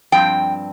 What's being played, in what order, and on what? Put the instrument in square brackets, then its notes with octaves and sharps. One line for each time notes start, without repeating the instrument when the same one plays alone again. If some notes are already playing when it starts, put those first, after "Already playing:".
[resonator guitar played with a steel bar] G2 F3 C4 G5